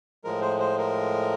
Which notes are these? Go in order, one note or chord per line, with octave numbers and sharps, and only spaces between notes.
A2 F3 G#3 A#4
C5
C5
A#4